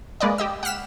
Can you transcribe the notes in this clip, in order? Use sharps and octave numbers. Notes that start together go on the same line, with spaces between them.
G#3 A#3 B4 D5 D#5
G4 D#5 E6
F#5 G5 F6 B6 E7